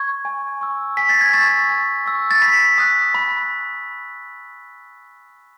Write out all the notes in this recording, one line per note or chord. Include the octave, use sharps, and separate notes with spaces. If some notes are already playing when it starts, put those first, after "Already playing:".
Already playing: C#6 G#6
G#5
C#6 E6
G#5 B6
A6
G#6
C#6 E6 A6
G#5
C#6 E6
A6
B5 B6
D#6 F#6
B5